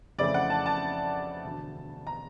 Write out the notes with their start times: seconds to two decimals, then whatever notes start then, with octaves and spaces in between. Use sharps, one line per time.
0.19 F2 C#3 E3 A3 C4 D5
0.34 F#5
0.50 A5
0.66 A5
1.44 E1 D2 D3
2.07 A#5